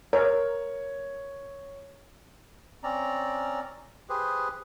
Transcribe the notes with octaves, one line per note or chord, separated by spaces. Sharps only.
A#4 C#5
C4 C#4 D5 A#5
G4 G#4 B4 C5